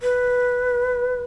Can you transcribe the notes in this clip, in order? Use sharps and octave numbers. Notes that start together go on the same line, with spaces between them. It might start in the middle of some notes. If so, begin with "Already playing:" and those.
B4